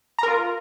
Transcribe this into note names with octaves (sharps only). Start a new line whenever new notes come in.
F4 A#4 A#5